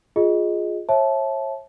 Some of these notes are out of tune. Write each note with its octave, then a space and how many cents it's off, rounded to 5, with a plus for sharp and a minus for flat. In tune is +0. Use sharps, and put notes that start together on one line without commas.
F4 +15 G#4 +0 D#5 +0
C#5 -35 E5 +0 A5 -25